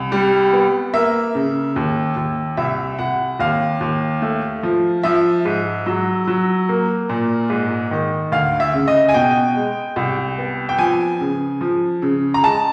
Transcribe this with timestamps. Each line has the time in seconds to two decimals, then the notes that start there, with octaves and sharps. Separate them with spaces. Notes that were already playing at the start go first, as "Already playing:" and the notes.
Already playing: C2
0.12 G3
0.53 B3
0.94 A#3 E5
1.35 C#3
1.76 D#2
2.16 D#2
2.57 C2 E5
2.99 C2 F#5
3.39 D#2 F5
3.81 D#2
4.22 A3
4.63 F3
5.03 F3 E5
5.45 G#2
5.86 F#3
6.28 F#3
6.69 A#3
7.09 A#2
7.50 G#2
7.91 D#3
8.32 D2 F5
8.60 E5
8.74 C#3
8.88 D#5
9.09 G#5
9.14 B2 G5
9.56 G#3
9.96 C2
10.38 B3
10.69 G5
10.79 F3 G#5
11.21 C#3
11.61 F3
12.02 C#3
12.34 A#5
12.43 G#3 A5